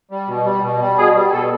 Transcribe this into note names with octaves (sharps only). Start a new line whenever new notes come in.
G3
B2
G3
B2
G3
B2 G#4
G3
B2 A4